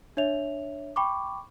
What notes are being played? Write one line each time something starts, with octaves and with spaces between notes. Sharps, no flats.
D4 C#5 E5 F7
G5 B5 C#6 D6